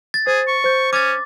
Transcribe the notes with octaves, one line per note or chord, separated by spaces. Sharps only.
A6
G#4 C5
C#6
C5 G6
C#4 D6 A6